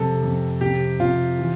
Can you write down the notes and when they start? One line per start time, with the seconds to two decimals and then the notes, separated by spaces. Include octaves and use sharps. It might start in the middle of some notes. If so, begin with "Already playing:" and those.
Already playing: F2 C3 A4
0.23 F2
0.61 C3 G4
1.00 C3 F4
1.39 E3